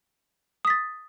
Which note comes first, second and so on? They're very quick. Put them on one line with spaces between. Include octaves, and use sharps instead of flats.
D#6 B6 A6